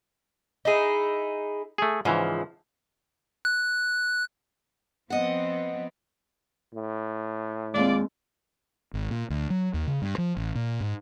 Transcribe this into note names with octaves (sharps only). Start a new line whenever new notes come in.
D#4 E4 G#4
A3 G#4
G#2 C#3 E3 F3
F#6
F3 B3 C4 D#5 F#5
A2
D#2 G#3 C4 F4 D5
G#1
A#2
D2
F#3
D#2
C#3
G2
F3
A1
A#2
G#2